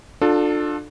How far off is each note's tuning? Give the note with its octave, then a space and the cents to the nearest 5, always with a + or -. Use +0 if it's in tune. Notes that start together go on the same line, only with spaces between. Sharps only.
D4 +25 F4 +30 A4 +0